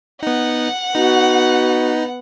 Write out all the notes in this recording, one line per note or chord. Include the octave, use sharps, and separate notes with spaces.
B3 D#4 F#5
B3 D#4 F#4